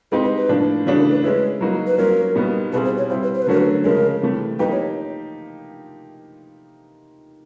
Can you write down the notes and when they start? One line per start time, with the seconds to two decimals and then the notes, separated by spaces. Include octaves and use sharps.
0.12 G#3 C4 D#4 G4 B4
0.24 B4
0.37 B4
0.49 A2 F3 A#3 D4
0.86 C#3 E3 A3 D4 F#4 C#5
0.98 A#4
1.11 B4
1.23 G#3 C#4 E4 B4
1.61 F#3 A#3 D#4 F#4
1.87 B4
1.98 F#3 A#3 C#4 F4 A#4
2.35 A#2 G3 B3 D#4 F#4
2.73 B2 G3 C4 E4 G#4 B4
2.85 C5
2.98 C#5
3.10 G3 C4 E4 C5
3.23 B4
3.35 C5
3.42 B4
3.47 D3 F#3 A3 C#4 F#4 A#4
3.57 B4
3.84 C#3 F3 G#3 C#4 A#4
4.22 C3 E3 A3
4.59 F3 A#3 D#4 G4 B4
4.72 C#5